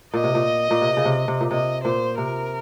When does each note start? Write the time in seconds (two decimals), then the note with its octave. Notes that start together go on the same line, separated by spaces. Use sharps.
0.14 A#2 D#5
0.24 C3
0.35 A#2
0.71 A#2
0.82 C3
0.97 C#3
1.05 C3
1.28 C3
1.41 A#2
1.51 C3 D#5
1.84 A#2 C5
2.18 C3 A#4